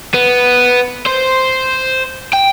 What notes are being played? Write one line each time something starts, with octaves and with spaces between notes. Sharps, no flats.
B3
C5
G5